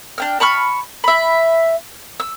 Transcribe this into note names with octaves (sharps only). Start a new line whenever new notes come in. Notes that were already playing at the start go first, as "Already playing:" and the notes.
D4 G5 F6
A5 B5 C#6 F6
E5 B5
E6